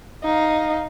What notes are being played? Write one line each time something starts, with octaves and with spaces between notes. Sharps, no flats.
D#4 F5